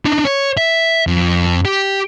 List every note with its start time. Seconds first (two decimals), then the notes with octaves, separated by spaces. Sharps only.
0.05 D4 D#4
0.25 C#5
0.57 E5
1.07 F2
1.65 G4